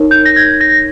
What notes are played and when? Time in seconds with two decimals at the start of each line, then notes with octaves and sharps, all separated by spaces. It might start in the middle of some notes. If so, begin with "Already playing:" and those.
Already playing: D#4 A#4 C#5
0.11 G6
0.26 A#6
0.36 G#6
0.61 A#6